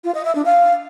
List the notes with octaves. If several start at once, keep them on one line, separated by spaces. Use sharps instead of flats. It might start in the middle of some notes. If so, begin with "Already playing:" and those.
F4
D#5
E5
D4
F5